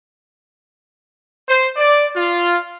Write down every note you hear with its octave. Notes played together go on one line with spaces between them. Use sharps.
C5
D5
F4